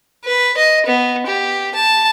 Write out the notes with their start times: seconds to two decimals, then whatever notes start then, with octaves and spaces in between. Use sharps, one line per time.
0.25 B4
0.57 D#5
0.86 B3
1.27 G4
1.75 A5